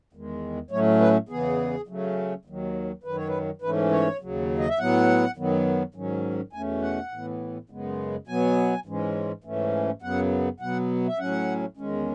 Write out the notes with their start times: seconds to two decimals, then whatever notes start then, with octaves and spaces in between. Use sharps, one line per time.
0.13 E2 D#3 G#3
0.71 A2 F#3 A3 C#4 C#5
1.00 B4
1.29 E2 C#3 E3 B3 G#4
1.87 C#3 F#3 A3 C#4
2.45 D#2 D#3 F#3
3.04 F#2 D#3 F#3 B4
3.16 C#5
3.28 B4
3.62 G#2 E3 A3 C#4 B4
3.91 C#5
4.20 D#2 C#3 F#3
4.59 D#5
4.69 E5
4.78 A2 F#3 B3 F#5
5.36 F#2 D#3 F#3 B3
5.94 G#2 D#3 F#3 C#4
6.53 E2 B2 A3 C#4 G#5
6.82 F#5
7.12 A2 E3 B3
7.70 F#2 C#3 G#3 B3
8.27 B2 F#3 B3 G#5
8.86 G#2 E3 G#3 C#4
9.44 G#2 E3 A3 C#4
10.02 F#2 C#3 F#3 B3 F#5
10.60 B2 F#3 B3 F#5
11.08 E5
11.19 A2 F#3 C#4 F#5
11.77 E2 D#3 G#3 C#4